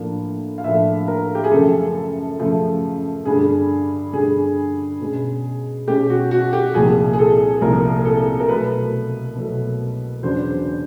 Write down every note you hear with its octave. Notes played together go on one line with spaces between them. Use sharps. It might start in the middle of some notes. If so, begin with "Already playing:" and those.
Already playing: A2 F3 A#3 D4
F5
A2 F3 A#3 D4 E5
A#4
G4
G#4
F#2 C#3 F3 A3 A4
F#2 C#3 F3 A3
G2 D3 G3 G#4
G2 D3 G3 G#4
B2 G#3 C#4
B2 G#3 C#4 G4
F#4
F#4
G4
C2 A#2 F3 G#4
G#4
A4
C2 A#2 F3 A#4
A4
A#4
B2 F#3 A3 B4
B2 F#3 A3
E2 C#3 F#3 B3 D4 C5